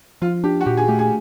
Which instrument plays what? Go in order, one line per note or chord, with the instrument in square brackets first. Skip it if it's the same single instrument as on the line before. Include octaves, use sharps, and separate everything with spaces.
[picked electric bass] F3 [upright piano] F4
[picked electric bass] D4 [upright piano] G4
[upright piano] F#4
[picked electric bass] A#2 [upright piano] G4
[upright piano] G#4
[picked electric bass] A3 [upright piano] G4
[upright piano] G#4